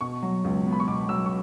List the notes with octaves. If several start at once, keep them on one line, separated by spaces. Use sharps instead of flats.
B2 C#6
F#3
C#2
B3
B5
C#6
B2 D6
F#3 E6
C#6